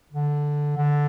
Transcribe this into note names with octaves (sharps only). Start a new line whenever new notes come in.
D3
D3